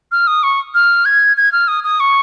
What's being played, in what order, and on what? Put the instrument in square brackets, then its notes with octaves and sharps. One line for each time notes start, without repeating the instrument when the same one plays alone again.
[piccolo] F6
D#6
C#6
F6
G#6
G#6
F6
D#6
D#6
C#6